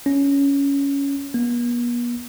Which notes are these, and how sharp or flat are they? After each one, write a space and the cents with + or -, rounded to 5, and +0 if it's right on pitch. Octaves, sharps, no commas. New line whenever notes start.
C#4 +10
B3 -45